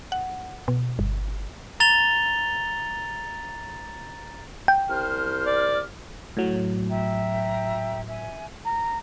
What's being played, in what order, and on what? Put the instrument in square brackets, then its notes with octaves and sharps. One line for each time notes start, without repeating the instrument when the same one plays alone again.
[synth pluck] F#5
B2
G1
[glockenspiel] A#5 A6 F7 G7
[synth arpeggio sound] G5
[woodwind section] C2 C5 F6
[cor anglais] D5
[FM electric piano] A2 F#3
[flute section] E5 G5 A#5
E5 G#5
A#5